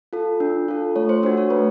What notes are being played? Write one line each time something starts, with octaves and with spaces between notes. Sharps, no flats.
F4 A4
D4
F4 A4
A3 C#5
C5
D4 F#4 C5
C#5
A3 B4